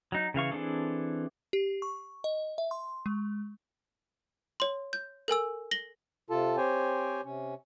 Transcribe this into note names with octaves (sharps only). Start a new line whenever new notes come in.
F#3 D#4
C#3 E3 F5 C#6
E3 C4 D4 G#4 A4
G4
C#6
D#5
E5
C6
G#3
C#5 C6
G6
A4 A#4 G#5 E6
A#6 F#7 G7
C3 F4 A4 A5
C4 G4 C5 C#5 G5 G#5
C3 C#4